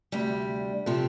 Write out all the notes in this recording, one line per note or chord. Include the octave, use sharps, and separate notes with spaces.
D2 C3 G3
C3 F3 A3 C4